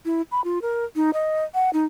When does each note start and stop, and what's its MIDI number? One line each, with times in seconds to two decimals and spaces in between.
0.05 0.22 64
0.32 0.43 83
0.44 0.61 65
0.62 0.85 70
0.96 1.11 63
1.13 1.44 75
1.54 1.70 78
1.73 1.85 63